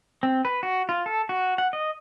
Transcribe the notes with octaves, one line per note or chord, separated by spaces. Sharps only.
C4
B4
F#4
F4
A4
F#4
F#5
D#5